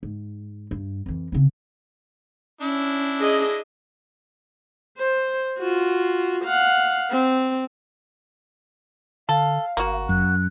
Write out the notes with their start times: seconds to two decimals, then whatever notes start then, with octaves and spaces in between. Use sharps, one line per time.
0.03 G#2
0.71 G2
1.06 F2 E3
1.32 C#3 C4
2.61 C#4 D4 E4
3.19 G#4 D#5
4.97 C5
5.58 F4 F#4
6.44 F5 F#5
7.10 C4
9.29 D3 A4 F5
9.77 G1 A#3 F#4
10.09 F#2 F#6